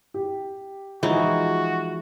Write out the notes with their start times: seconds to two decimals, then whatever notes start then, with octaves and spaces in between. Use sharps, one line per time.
0.14 G4
1.03 E3 F3 G#3 D#4 F#4